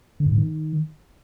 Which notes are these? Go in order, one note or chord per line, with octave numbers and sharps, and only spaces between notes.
D3
G2
A2
D#3